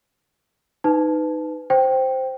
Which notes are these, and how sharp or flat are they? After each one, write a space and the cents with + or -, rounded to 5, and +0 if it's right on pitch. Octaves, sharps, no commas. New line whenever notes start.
D#4 +0 B4 +20 A5 -15
C5 +0 G5 -5